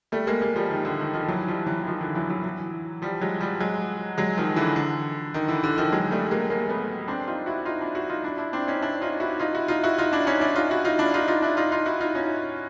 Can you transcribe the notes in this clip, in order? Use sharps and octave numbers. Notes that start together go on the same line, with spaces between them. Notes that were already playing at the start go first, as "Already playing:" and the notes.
G3 A3
G#3 A#3
G#3 A#3
F3 G3
D#3
D3
D#3
D#3 F3
E3 F#3
F3 G3
E3 F#3
E3
D#3 F3
D3 E3
E3 F#3
E3 F#3
E3 F#3
F3 G3
F#3 G#3
F3 G3
F#3 G#3
F#3 G#3
D#3 F3
D3 E3
D3
D#3
D3 E3
D3
D#3 F3
F#3 G#3
G3 A3
G#3 A#3
G#3 A#3
A3 B3
C4 D4
D#4 F4
E4 F#4
D#4 F4
D4 E4
E4 F#4
D#4 F4
D4 E4
D4 E4
C4 D4
C#4 D#4
D4 E4
D#4 F4
E4 F#4
D#4 F4
E4 F#4
D#4 F4
E4 F#4
D#4 F4
D4 E4
C#4 D#4
D4 E4
D#4 F4
E4 F#4
D#4 F4
D4 E4
D#4 F4
D#4 F4
D4 E4
D#4 F4
D#4 F4
E4 F#4
D#4 F4
C#4 D#4